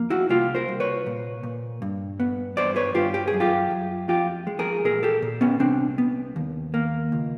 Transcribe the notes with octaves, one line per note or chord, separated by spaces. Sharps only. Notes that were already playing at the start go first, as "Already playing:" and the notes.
Already playing: F2 A#3
E4 F#4
C2 F4 G4
A#4 C5
C2
B4 C#5
A#2
A#2
G2
B3
G2 C5 D5
B4 C#5
G2 F4 G4
G4
G#4
F#2
F4 G4
F#2
F2 F4 G4
G#3
G#4 A#4
A#2 G#4 A#4
G4 A4
A#2
B3 C#4
C2 C4 D4
B3
D#2
A#3
C#2